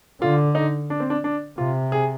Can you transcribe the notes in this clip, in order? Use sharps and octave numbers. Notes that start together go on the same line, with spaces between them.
D3 F4
D#4
D4
C4
D4
D4
C3 F4
G#4